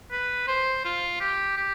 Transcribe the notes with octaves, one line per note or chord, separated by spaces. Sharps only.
B4
C5
F4
G4
G4